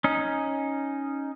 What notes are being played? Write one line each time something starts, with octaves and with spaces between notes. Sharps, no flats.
C#4 D#4